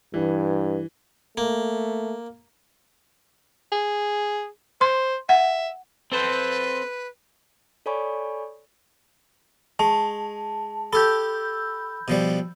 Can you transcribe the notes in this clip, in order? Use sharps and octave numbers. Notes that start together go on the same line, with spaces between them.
G2 E3
A3 A#3
G#4
C5 C6
E5 F#5
C4 A4 B4 C5
A4 C#5 D5 G#5 B5 C#6
G#3 A5
G4 A4 B5 E6 G6
B2 F3 G3